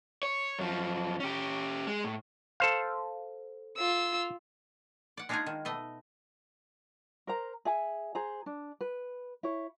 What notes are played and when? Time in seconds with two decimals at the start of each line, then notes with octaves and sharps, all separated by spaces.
0.23 C#5
0.59 F#2 F3
1.20 C#4 G4
1.87 G#3
2.04 A2
2.60 A4 C5 F5
3.77 F4 E6
5.17 D5 F#5
5.29 G#3 D4 D#4 F4 F#4 G#4
5.46 D#3
5.65 B2 A3 D#5
7.27 A#4 C5 A#5
7.65 G#4 E5 G#5
8.15 G#4 C5 A#5
8.46 D4
8.81 B4
9.43 E4 C#5